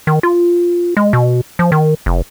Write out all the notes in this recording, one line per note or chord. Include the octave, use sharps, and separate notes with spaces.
D#3
F4
G#3
B2
F3
D#3
F1